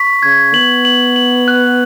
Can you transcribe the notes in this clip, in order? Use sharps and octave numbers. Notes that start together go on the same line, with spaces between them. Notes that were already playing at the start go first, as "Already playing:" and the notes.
Already playing: C#6 B6
C#3 G#6
B3 F#7
F#7
F#7
F#6